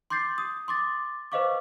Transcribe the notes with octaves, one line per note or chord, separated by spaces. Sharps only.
C6 D6 G6 A6 C7
D#6
C6 D6 A6
B4 C5 D#5 F5 C#6 D6